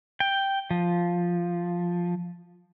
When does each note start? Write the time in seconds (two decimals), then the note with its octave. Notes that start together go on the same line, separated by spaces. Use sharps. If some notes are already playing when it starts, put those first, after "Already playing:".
0.20 G5
0.71 F3